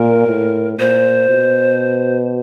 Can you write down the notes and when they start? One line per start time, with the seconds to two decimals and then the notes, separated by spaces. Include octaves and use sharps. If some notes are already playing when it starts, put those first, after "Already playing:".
Already playing: A#2 A#4
0.27 A2
0.78 A#2 C5
1.30 B2